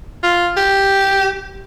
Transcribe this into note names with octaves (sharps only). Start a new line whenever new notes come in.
F4
G4